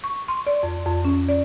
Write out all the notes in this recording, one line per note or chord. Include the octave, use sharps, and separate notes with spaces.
C#6
C6
D5
F2
F2
C#4
D5